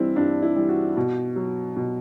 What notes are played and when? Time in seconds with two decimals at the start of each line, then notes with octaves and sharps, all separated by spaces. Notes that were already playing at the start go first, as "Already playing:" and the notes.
Already playing: G2 E3 G3 C4 E4
0.16 G2 D4
0.42 E4
0.56 E3 G3
0.69 F#4
0.97 B2
1.36 F#3
1.76 B2